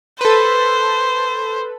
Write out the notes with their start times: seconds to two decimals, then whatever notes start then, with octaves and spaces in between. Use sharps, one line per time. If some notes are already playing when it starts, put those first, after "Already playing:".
0.21 A4 B4 C5